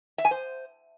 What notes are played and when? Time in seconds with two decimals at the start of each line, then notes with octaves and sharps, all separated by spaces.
0.18 E5
0.25 G#5
0.31 C5